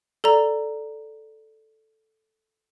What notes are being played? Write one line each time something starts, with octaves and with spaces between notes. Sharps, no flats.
A4 D5 A#5